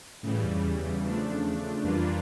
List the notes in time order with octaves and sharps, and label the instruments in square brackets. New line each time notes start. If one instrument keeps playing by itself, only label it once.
[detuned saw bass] A2 [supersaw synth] C#3 E3 G3
[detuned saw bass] F2
E2
E2
[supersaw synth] C#3 F3 A3 D4
[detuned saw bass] F2 [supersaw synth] E3 G3 A#3 D4 F4